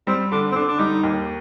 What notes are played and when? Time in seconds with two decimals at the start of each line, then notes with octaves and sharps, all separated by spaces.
0.07 G3 C4
0.32 D3 D4
0.52 C4
0.56 D3 D4
0.68 D4
0.79 G3 D#4
1.03 D#2